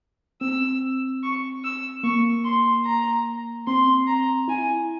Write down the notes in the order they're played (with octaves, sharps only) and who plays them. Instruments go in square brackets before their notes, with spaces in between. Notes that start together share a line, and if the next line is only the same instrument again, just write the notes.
[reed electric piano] C4 [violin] E6
[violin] C#6
E6
[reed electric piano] A#3 [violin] C#6
[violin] C6
A#5
[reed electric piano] C4 [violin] C6
[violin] A#5
[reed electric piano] E4 [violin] G#5